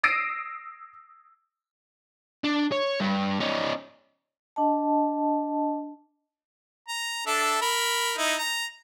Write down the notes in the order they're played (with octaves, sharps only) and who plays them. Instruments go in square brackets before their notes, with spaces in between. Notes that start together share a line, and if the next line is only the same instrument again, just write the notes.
[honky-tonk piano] D#6 E6 A#6 C7 D7 D#7
[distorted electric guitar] D4
C#5
G2
C#4 D#4
[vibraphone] D4 D#5 A5
[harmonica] A#5
D4 A4 E5
A#4 B5
D#4 E4
A#5